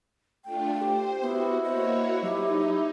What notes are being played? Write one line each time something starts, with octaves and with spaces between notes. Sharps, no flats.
A3 D4 F4 G5
G4 C5
B3 E4 F#4
A#3 F#4 C5 C#5 D#5
F#3 D#4 G4